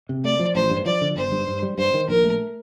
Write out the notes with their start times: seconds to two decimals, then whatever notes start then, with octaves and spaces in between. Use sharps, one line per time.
0.09 C3
0.24 A3 D5
0.39 F3
0.55 A1 C5
0.70 G2
0.86 F3 D5
1.01 D3
1.16 G1 C5
1.32 G2
1.48 G2
1.63 G3
1.78 G2 C5
1.94 D#3
2.08 A#1 A#4
2.24 A3